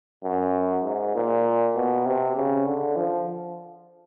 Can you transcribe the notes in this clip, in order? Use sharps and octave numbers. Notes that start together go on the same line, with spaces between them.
F#2
G#2
A#2
B2
C3
C#3
D3
F3